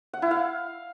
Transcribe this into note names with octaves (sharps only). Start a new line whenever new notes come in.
F#5
E4
F5